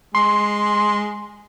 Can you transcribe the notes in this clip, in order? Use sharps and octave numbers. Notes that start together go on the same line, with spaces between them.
G#3 C6